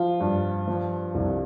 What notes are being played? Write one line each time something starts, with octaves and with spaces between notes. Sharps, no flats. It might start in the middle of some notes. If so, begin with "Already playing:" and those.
Already playing: F3 F4
G2
F3
C2